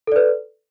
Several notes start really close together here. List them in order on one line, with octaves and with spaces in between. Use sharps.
A4 D5 B4